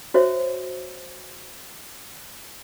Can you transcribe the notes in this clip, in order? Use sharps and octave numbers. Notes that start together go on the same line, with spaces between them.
F#4 C5 C#5 E5